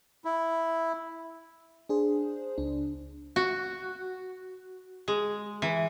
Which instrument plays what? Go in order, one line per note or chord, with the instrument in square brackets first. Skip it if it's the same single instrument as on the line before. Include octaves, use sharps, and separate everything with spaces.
[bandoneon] E4
[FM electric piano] D4 G#4 C5
C#2 D4
[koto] F#4
G#3
E3